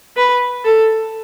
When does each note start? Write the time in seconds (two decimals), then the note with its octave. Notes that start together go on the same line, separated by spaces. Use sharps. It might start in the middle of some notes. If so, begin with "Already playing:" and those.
0.17 B4
0.65 A4